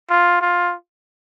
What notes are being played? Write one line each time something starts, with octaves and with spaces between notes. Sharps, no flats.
F4
F4